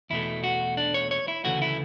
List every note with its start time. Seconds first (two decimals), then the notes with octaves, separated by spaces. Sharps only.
0.10 E2 B2 A3 E4
0.44 F#4
0.77 D4
0.94 C#5
1.11 C#5
1.28 E4
1.45 D2 C#3 E3 A3 F#4
1.62 E4